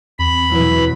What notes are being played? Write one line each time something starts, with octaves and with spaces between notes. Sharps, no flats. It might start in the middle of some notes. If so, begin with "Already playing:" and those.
E2 C4 B5
B2 E3 F#3 E4 B4